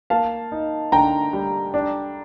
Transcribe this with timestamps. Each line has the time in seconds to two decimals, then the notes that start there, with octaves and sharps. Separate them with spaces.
0.10 A#3 F5 A5
0.52 D#4
0.92 D3 G5 A#5
1.33 G3
1.74 D4